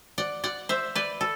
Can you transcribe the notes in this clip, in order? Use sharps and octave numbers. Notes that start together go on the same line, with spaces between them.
D5 F#5
D5 F#5
C5 E5
B4 D5
A4